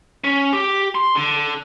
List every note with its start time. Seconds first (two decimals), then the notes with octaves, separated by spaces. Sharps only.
0.24 C#4
0.53 G4
0.95 C6
1.15 D3